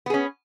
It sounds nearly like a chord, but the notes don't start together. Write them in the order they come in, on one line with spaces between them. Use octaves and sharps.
B3 G#4 C#4